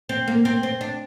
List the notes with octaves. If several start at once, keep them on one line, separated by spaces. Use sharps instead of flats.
C4
A#3
C4
C4
D4